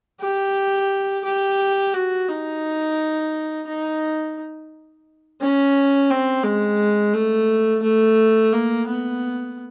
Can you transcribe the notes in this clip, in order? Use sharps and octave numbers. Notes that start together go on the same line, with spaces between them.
G4
G4
F#4
D#4
D#4
C#4
C4
G#3
A3
A3
A#3
B3